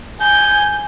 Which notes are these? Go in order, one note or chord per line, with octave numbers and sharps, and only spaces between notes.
G#5 G6